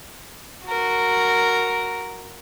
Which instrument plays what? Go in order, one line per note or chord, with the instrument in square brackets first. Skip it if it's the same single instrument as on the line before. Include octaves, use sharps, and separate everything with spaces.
[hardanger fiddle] F#4 A#4